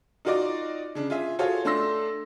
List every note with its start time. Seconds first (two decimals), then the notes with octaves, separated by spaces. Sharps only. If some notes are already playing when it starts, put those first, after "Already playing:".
0.25 D#4 F4 F#4 D5 D#5 D6
0.95 C#3 D4
1.10 F4 G#4 E5
1.39 F4 F#4 G#4 A4 C#5 F5
1.65 A3 D4 A4 C6 E6 A#6